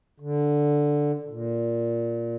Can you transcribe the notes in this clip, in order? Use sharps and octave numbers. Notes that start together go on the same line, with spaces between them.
D3
A#2